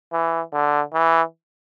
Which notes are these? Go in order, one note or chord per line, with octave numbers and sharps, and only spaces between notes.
E3
D3
E3